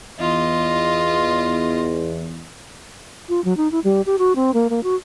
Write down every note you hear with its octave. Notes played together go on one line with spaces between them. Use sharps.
E2 F4 D#5
F4
F#3
D#4
E4
G3
G4
F#4
C4
A#3
A#3
F#4